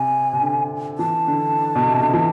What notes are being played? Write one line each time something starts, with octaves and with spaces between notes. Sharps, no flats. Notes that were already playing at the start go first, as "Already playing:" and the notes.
Already playing: C3 G#5
C3
D3
E3 A5
D3
B2
C3
D3
E3